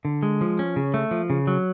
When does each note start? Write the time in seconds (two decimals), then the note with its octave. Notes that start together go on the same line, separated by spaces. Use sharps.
0.05 D3
0.23 G#3
0.41 F3
0.59 C#4
0.76 C#3
0.94 A3
1.11 F3
1.30 C#3
1.47 F#3